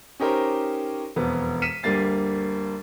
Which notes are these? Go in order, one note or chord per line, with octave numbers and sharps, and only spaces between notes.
C#4 D#4 G4 A#4 C5
E1 F2 B3
F6 B6 C#7 D#7 E7
D2 G2 G3 A#3 A6 C7